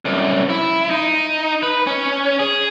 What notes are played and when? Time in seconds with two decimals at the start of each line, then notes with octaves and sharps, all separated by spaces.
0.05 C2 F#2
0.50 E4
0.90 D#4
1.63 B4
1.87 C#4
2.39 G#4